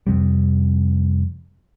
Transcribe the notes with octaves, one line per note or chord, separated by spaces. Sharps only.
F2 C3 G3